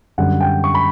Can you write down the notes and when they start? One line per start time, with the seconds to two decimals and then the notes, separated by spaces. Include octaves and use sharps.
0.18 F#2 D3 G3 F#5
0.41 G5
0.64 C#6
0.75 B5